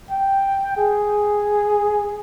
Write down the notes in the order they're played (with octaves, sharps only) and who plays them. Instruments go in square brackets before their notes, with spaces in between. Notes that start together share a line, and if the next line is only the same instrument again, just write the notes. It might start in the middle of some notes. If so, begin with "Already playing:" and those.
[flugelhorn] G5
G#4